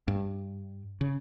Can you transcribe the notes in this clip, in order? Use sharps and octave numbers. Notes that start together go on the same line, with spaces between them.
G2
C#3